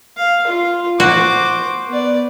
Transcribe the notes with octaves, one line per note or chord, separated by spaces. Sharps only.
F5
F4
F#4 C5 D6
B3 D5